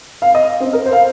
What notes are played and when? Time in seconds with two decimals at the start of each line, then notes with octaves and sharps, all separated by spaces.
0.22 F5
0.35 D#5
0.60 C4
0.73 A#4
0.86 C5
0.93 F5